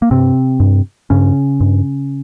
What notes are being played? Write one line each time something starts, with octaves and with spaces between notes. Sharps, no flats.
A#3
G2 C3 C4
G2
G2 C#3 C#4
G2